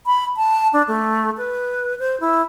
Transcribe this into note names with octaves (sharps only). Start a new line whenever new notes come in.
B5
A5
D4
A3
B4
C5
E4